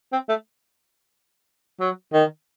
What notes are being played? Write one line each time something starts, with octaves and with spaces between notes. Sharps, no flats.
C4
A3
F#3
D#3